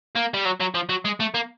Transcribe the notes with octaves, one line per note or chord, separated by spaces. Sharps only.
A#3
G3
F#3
F#3
F3
F#3
G#3
A3
A#3